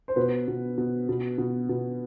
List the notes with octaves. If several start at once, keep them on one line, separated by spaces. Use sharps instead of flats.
C5
B2 B4
B2
B2
B2
B2
B2